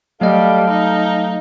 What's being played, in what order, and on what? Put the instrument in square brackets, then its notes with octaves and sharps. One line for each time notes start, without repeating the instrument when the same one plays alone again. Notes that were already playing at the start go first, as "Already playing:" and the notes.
[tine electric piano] F#3 A3 D#5 [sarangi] G3 [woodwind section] A4 F5
[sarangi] D#4